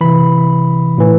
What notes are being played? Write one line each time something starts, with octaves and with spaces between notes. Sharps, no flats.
C3 E3 B5
A2 E3